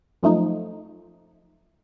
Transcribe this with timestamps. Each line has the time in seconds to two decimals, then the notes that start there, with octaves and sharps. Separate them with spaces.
0.23 F#2 F3 A3 D#4